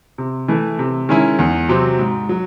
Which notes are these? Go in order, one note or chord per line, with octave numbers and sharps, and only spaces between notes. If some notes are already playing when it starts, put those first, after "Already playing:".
C3
E3 A3
C3
D#3 G#3 C#4 E4
E2
C3 F#3 C4
G#2
F#3